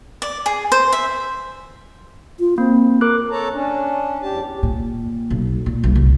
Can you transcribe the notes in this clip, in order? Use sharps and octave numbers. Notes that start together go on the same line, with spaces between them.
D5
G#4
C5
E5
F4
A#3 C4
A#4 D6 F#6
A4 C#5 A5 A#5
C#4 D4
E2 G4 A5
A#2
B1
A#2
B1
C2